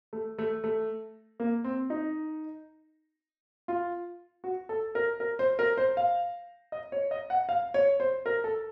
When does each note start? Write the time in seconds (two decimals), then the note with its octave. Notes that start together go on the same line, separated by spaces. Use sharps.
0.13 A3
0.38 A3
0.64 A3
1.40 A#3
1.64 C4
1.90 D#4
3.68 F4
4.44 F#4
4.69 A4
4.95 A#4
5.20 A#4
5.39 C5
5.59 A#4
5.77 C5
5.97 F5
6.72 D#5
6.92 C#5
7.11 D#5
7.30 F#5
7.49 F5
7.74 C#5
8.00 C5
8.26 A#4
8.44 A4